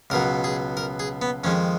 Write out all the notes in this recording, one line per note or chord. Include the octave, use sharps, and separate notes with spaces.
C#2 B2 F#3 A#4
G#4
A#4
G#4
B3
F2 D#3 G#3 C#4